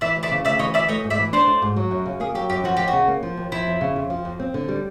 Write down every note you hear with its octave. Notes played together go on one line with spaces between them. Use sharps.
E3 D5 E5
D2
D5 E5
C#3
D2 D5 E5
E3 C#5 D#5
D2 D5 E5
A3 C#5 D#5
G#2
D5 E5
E3
D4 C5 D5
A3
G#2
F#3
F#2
C#3
A#3 G#4
F#3 G4
F#2 G4
F3 F#4
D#2 G4
F#4
C#3
A#3
F3
D#2
F3 E4
F2
C#3
F2
F3
F2
C4
D3
G3